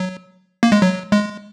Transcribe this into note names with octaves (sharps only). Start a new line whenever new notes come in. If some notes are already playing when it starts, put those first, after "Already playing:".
Already playing: F#3
A#3
G#3
F#3
G#3